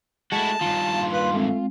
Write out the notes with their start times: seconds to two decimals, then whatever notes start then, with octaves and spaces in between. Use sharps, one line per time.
0.32 G#3 A3 E4 F#4 A5
0.61 G2 D#3 F4
0.96 A#3 F5 C6
1.12 B4
1.32 G#3 A3 C4